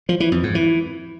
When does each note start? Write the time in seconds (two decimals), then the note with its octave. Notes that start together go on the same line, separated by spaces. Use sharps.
0.09 F3
0.20 E3
0.32 F2
0.43 G#2
0.55 E3